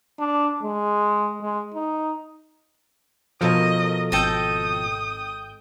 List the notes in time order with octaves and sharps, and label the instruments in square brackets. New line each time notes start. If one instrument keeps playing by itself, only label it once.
[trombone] D4
G#3
G#3
D#4
[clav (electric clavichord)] B2 F3 [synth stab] A4 A#4 [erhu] D#5
[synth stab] G#1 G5 G6 [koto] A4 D#5 [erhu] D#6